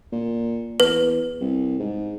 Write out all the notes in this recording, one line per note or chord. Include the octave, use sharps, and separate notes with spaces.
A#2
E2 B4
C2
G#2